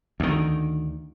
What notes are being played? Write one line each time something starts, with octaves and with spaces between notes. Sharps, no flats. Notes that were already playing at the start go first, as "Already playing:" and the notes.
D2 D#3